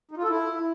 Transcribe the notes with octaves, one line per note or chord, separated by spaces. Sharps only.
D#4
F4
A4
E4